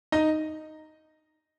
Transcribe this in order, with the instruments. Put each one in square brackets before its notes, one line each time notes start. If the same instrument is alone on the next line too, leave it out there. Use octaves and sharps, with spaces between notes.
[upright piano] D#4 D#5